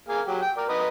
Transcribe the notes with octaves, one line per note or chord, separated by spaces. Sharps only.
A#3 G#4 F5
F#3 G4
G5
A#4 D5
B4 D#5 A#5